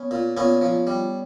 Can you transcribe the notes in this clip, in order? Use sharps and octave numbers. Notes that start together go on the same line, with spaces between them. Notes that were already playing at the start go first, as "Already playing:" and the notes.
Already playing: B3 C#4
A#2
A#2 B3 C#4
F3
G3